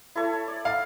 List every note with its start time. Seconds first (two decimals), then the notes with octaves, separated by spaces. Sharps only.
0.15 E4 A4 C#5
0.48 D5
0.65 F5